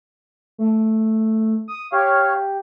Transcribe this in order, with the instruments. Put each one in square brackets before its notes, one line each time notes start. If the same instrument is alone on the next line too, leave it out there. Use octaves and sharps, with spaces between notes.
[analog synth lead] A3
D#6
[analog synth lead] G4 [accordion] C#5 F5